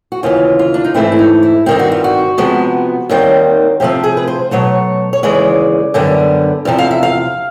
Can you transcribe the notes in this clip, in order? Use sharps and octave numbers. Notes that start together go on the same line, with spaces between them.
F#4
D#2 C#3 E3 F4
F4
D4
D#4
G#2 E3 A3 C4 E4
D4
D#4
E4
G2 D#3 G3 C4 G4
F#4
F4
F#4
C3 F3 G#3 B3
D#2 D#3 G3 C4
C3 F3 A3 C4 G4
G#4
B4
C5
B2 F#3 A3 C#5
C#5
D#2 C#3 E3 G#3 D5
F#2 D3 G3 B3
E2 C3 F3
F5
E5
F5